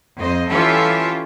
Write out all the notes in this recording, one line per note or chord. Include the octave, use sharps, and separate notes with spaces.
F2 C5 D#5
E3 C#4 F4 G4 A4 E5